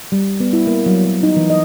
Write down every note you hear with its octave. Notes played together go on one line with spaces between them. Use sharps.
G3
B3
E4
A#3
F#3
F#3
D#4
E3
D#5